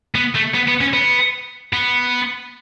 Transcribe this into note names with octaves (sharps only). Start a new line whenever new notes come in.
B3
A3
B3
B3
C#4
B3
B3